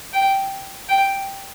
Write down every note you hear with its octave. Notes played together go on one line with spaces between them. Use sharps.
G5
G5